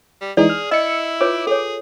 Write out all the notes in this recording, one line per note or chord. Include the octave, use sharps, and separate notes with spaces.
G3
E3 G#3 D#4 G#4 D5
F6
E4 D#5 E6 C#7
F4 B4 C#5 D6
G#4 A4 C#5